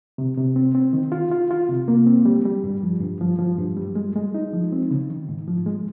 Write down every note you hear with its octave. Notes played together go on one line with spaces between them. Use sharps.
C3
C3
C4
C4
D#3
F4
F4
F4
C3
A#3
C4
G3
G3
G2
F3
G2
F3
F3
G2
G3
G#3
G#3
D#4
F3
C4
C#3
D#3
G#2
F3
G#3